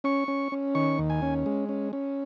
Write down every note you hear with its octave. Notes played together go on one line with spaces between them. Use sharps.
C#4 C#6
C#4
C#4
D#3 C#6
D#2
G#5
C#4
G#3
C#4
C#4